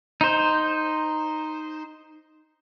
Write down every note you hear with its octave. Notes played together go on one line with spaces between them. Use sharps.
D#4 C5